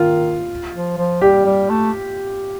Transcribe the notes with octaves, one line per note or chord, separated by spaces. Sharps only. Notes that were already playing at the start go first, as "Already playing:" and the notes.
Already playing: D#3 F4
F3
F3
G3 G4
G3
A3